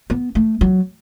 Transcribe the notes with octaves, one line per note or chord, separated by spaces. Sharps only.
B3
A3
F#3